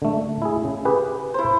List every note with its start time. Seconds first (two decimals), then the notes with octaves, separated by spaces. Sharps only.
0.02 D3 A3
0.42 E4 G#4
0.64 C#3
0.85 G4 G#4 B4
1.34 E4 C5